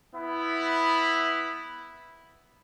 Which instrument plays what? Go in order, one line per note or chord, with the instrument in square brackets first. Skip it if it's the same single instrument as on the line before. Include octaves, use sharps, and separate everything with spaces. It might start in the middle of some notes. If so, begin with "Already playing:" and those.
[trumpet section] B3 E4